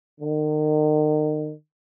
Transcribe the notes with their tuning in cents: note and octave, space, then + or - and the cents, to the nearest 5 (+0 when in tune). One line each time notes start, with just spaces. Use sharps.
D#3 -35